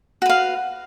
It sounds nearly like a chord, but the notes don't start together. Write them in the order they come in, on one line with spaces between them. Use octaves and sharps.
F#4 B4 F5